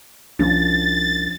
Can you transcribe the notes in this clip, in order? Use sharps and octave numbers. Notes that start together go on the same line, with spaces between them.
C2 F3 C#4 D4 A6